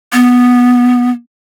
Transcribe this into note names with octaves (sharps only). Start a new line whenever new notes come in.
B3